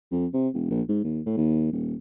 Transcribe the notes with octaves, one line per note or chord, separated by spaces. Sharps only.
F2
C3
E1
A#1
G#2
D#2
A2
D#2
D#1